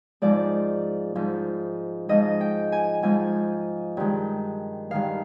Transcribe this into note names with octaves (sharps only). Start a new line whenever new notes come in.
G#2 F3 G#3 D5
G#2 F3 G#3
G#2 F3 G#3 D#5
G5
G#5
G#2 F3 G#3 G#5
G2 D#3 G#3
G2 D#3 G#3 F5